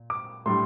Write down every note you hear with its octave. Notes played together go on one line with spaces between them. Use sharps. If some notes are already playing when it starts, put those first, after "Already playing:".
Already playing: A#2
D6
A2 G3 D4 C6